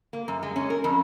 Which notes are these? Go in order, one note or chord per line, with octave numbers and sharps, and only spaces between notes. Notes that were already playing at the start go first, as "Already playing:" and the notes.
A#3
F#2
G#3
C#4
A#4
F2